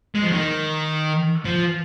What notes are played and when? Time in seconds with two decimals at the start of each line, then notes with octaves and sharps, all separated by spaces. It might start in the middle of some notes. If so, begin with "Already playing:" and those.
0.15 G#3
0.23 F3
0.32 D#3
1.45 F3